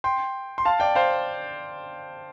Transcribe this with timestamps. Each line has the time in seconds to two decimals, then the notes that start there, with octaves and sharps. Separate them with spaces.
0.04 G5 C6
0.58 C6
0.65 F5 A5
0.80 D5 G5
0.95 C5 F5